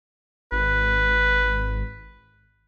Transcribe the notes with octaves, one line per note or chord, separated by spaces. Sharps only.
G#1 B4